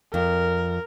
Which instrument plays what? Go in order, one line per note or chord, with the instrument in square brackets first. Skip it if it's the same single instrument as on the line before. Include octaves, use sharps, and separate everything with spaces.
[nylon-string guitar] F2 [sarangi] A#4